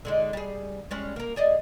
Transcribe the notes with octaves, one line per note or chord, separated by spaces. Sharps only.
D3 G#3 D#4
G3 G#4
G3 G#3 C#4
A#3 A#4
G#4 D5 D#5